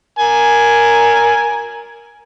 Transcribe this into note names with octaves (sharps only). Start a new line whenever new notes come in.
A#4 G#5